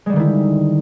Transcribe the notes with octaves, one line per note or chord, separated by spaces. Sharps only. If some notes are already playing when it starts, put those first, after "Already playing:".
D3 D#3 G3 G#3 E4